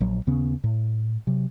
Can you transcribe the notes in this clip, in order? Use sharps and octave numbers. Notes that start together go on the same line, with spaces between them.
A#1 F#3
D#2 C#3 B3 C#4
A2
C3 F#3